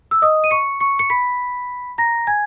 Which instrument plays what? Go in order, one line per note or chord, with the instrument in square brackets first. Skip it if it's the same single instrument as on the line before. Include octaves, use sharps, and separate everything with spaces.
[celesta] E6
D#5 D#6
D#7
C#6 C#7
C#6 C#7
C#7
B5 B6
A#5 A#6
G#5 G#6